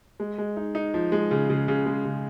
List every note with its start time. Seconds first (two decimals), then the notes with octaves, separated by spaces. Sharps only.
0.20 G#3
0.38 G#3
0.57 D#4
0.75 D#4
0.94 F3
1.12 G#3
1.31 C#3
1.50 C#3
1.68 C#3
1.86 G#3
2.05 C#3